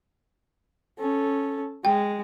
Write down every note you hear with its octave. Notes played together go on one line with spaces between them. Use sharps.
C#4 A4
G#3 G5